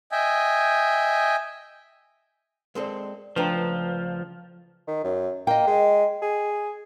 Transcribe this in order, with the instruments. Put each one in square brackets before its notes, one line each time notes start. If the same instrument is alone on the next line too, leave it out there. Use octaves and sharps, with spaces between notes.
[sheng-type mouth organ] D#5 E5 G5 G#5
[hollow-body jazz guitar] G#3 C4 A4 [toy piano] A#4 D5
[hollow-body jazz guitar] C#2 A3 D4 [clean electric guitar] F3 [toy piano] B4 G5 A#5
[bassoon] D#3
F#2
[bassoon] A#3 [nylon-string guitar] D#5 G5
[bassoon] G#3
G#4